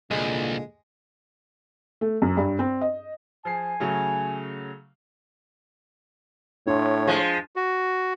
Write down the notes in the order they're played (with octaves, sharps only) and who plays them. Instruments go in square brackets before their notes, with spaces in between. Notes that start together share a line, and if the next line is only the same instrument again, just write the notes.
[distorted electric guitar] C2 [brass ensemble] A#2 D3 A#3 [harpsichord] G#3
[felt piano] A3
F#2
G2
C4
D#5
[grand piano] F3 G#4 C7 [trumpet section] G#5
[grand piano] C#3 F#3 A3
[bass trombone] A2 [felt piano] D4 C6 [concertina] C#5
[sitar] F3 G#3
[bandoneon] F#4